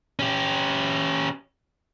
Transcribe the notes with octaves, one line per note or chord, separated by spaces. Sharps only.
C#4 G4